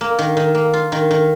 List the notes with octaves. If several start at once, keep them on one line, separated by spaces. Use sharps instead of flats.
A#3
D#3
D#3
A#3
F4
D#3
D#3